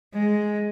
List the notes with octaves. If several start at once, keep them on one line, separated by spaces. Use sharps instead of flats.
G#3